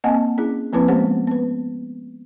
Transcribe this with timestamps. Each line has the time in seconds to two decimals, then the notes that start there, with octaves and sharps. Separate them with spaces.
0.04 A#3 C4 D#5 F#5 G#5 A5
0.38 C#4 E4 G#4
0.73 F3 A#3 C4 E4 B4
0.88 G#3 B3 C#4 G4 C5 F#5
1.27 B3 B4